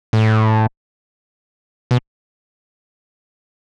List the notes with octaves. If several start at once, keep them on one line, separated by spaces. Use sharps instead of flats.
A2
B2